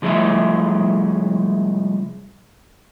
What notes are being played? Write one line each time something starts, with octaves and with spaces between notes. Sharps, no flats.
C2 F3 G#3 A3 E4 E5